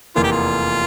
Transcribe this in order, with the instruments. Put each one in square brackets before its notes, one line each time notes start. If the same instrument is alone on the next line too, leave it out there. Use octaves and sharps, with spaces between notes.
[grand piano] F1 E2 E3 A#3 [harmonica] F4
[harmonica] G4
F4